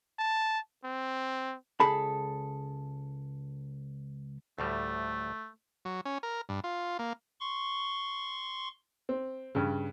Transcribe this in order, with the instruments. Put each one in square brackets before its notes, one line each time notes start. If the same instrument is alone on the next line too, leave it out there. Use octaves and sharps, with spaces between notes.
[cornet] A5
C4
[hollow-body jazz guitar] C#2 G#4 A4 A5 B5
[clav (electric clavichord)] D2 A2 G3 [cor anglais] A3
[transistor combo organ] F#3
C#4
A#4
G2
F4
A#3
[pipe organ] C6 C#6
[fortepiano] C4
G2 C#3